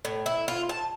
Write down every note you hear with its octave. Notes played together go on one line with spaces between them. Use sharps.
A2
E4
F4
A5